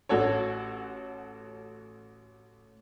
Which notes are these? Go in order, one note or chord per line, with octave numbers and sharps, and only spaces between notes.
A1 F#4 A4 C#5